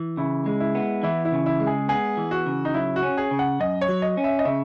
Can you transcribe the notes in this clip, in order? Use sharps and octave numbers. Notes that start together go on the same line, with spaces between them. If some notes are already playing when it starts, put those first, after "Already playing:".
Already playing: E3
C#3 E4
G#3
E4
B3
E3 E4
E4
C#3
E4
G#3
G#4
B3 G#4
E3
F#4
C#3
D#4
F#3 E4
F#4
C#4
G#4
C#3
F#5
F#2 D#5
C#5
F#3
D#5
C#4
E5
D#5
C#3 E5